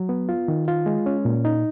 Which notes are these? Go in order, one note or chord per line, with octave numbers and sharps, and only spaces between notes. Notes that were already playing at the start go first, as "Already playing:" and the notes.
Already playing: F#3
B3
F4
D#3
F4
G#3
C#4
A#2
D#4